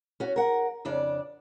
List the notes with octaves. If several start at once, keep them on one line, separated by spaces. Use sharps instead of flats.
C#4 F#4
A#4 F#5
F2 C#3 D4 D5